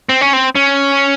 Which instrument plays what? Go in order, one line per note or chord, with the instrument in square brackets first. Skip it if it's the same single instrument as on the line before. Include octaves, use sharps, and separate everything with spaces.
[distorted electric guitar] C4
C#4
C4
C#4